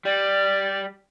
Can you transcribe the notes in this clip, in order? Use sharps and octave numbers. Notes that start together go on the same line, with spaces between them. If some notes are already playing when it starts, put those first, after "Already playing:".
G3 D5